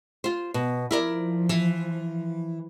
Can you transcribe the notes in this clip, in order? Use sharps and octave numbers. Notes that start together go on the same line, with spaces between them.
F4 C5
B2
F3 E4 A#4 D5
E3